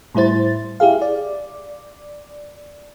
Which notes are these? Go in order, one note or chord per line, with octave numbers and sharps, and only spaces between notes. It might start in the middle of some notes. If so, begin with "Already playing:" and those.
A2 G3 E4 C5 A6
E4 G4 G#4 F5
D5